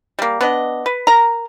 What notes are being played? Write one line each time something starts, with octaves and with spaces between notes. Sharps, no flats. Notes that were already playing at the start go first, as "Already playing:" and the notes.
G3 A#3
B3 D4 D#5
B4
A#4 A#5